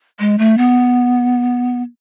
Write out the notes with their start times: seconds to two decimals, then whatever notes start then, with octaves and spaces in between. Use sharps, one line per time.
0.19 G#3
0.38 A3
0.58 B3